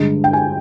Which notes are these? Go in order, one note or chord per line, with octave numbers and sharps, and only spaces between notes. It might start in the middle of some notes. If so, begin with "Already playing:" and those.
Already playing: G2 D3 G#3 A#5
G5
G#5